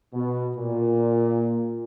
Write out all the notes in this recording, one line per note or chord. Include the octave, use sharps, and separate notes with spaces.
B2
A#2